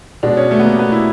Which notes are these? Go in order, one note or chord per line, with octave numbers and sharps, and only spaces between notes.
B2 G#3 D4
C#4
A3
B3
A#3
B3
E4